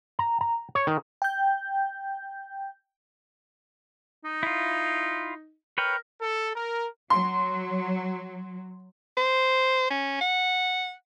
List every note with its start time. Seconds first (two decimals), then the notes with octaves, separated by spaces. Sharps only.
0.19 A#5
0.41 A#5
0.75 C#5
0.87 D#3
1.22 G5 G6
4.25 D#4
4.43 E4 F4
5.78 A#4 B4 C#5 G5
6.21 A4
6.55 A#4
7.10 F#3 C6
9.17 C5
9.91 C#4
10.21 F#5